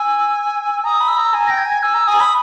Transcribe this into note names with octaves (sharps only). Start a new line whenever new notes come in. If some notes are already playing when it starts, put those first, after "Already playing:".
Already playing: G#5 E6
A#5 D#6
B5
E6
A#5
G#5
G5 A#6
G#6
G#5
G#5 E6
A#5
G#5 D#6
B5